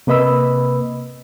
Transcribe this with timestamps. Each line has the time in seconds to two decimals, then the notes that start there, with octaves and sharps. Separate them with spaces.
0.07 C3 A#3 B4 D#5 B5 E6